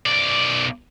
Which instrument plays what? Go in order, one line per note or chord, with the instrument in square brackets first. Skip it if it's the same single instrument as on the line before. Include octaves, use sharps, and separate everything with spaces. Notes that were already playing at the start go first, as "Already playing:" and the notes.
[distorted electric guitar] B1 D5